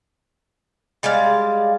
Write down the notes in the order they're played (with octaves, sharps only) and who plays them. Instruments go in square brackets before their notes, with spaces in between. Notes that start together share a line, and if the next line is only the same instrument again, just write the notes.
[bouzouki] G3 G#3 D5 F5